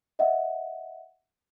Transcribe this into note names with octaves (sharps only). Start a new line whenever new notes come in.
D#5 E5 F#5